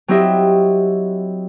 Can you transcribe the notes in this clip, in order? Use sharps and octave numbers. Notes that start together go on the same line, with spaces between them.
F#3 C4 E4 G4 D#5 E5